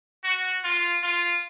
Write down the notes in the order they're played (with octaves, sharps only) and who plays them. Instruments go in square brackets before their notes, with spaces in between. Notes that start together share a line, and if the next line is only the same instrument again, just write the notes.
[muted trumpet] F#4
F4
F4